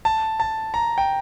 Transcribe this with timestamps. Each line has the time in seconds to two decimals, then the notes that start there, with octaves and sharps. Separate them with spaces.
0.05 A5
0.40 A5
0.74 A#5
0.98 G5